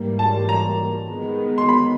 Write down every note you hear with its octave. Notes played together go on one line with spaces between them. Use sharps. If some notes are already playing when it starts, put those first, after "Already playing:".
Already playing: G#2 E3 G3 A#3
A5
A#5
D#3 G#3 B3
C6
B5